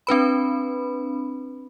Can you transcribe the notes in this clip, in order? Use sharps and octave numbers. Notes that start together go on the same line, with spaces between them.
C4 D4 B4 B5